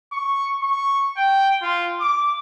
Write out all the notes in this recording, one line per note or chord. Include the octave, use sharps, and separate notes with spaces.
C#6
C#6
G5
F4
D6